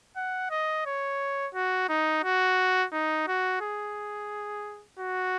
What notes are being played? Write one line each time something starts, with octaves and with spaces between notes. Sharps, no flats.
F#5
D#5
C#5
F#4
D#4
F#4
D#4
F#4
G#4
F#4